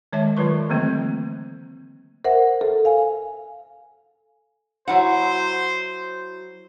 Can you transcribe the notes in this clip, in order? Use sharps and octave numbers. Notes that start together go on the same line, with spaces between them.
D#3 G#3 C#5 D#5 E5 A5
D#3 F#3 F4 B4 C#6
D3 E3 A3 A#3 C4
A#4 C5 E5 F#5
A4
F5 G#5
F#3 E4 C5 F#5